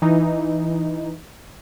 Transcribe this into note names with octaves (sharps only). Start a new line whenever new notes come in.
E3 D#4